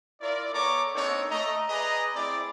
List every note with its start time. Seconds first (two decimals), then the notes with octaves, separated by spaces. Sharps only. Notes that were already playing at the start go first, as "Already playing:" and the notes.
0.21 E4 F4 A#4 D5
0.54 B3 A4 C#5 A#5 C#6 D6
0.95 A#3 C4 D4 D#4 A4 C#5
1.30 A3 D#5 A#5
1.69 G#4 B4 D5 D#5 A#5
2.14 A3 C4 E4 G#4 D5 D6